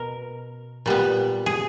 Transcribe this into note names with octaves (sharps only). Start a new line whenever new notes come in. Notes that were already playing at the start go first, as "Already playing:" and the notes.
Already playing: B2 A#4
A#2 G3 B3
G#4